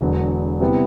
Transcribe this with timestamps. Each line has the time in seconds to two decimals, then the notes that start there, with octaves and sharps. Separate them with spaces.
0.01 E1 E2 D3 F#3 B3
0.60 C3 G3 B3 E4